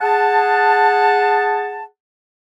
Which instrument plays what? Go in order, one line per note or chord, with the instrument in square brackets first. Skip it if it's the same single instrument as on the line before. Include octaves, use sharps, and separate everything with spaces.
[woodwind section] G#4 F#5 A5